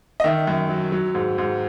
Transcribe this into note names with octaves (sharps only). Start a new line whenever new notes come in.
D#5
D#3 E5
F#2
F#3
F#3
G#2
G#2